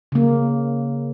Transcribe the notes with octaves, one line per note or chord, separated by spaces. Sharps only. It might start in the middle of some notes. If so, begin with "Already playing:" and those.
C#3 A#3